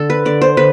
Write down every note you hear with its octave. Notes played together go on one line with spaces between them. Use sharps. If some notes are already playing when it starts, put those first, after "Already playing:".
Already playing: D3 A4
B4
D3 D5
C5
D3 B4